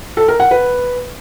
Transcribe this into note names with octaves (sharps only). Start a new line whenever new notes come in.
A4
A#4
F#5
B4